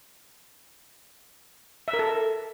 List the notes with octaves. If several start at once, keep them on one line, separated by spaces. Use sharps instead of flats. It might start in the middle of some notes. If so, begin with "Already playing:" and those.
E5
A#4
A4